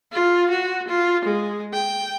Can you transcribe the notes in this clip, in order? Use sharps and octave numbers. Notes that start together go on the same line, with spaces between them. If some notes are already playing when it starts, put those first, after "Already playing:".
F4
F#4
F4
G#3
G5